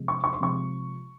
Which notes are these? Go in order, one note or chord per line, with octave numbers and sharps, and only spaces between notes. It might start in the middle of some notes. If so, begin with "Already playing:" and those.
Already playing: C3 F3 G#3
C#6
C#6
C6
C3 F3 G#3 C#6